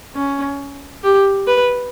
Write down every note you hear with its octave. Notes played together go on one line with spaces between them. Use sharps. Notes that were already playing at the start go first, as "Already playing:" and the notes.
C#4
G4
B4